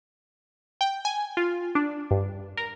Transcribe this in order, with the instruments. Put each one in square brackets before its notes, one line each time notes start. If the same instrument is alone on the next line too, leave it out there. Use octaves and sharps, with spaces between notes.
[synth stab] G5
G#5
F4
D4
G2
A#4